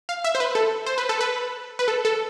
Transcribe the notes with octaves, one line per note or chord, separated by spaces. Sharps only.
F5
E5
C5
B4
A4
C5
B4
A4
B4
B4
A4
A4